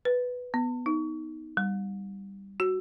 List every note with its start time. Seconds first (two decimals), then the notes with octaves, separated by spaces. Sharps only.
0.05 B4
0.54 B3
0.86 D#4
1.57 G3
2.60 F#4